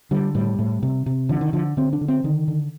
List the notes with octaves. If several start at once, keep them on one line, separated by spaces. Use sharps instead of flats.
D3 G3
A2 G3
A2
C3
C3
D3 F3
D#3
D3 F3
D3 C4
D4
D3
C4
D3 D#3
D3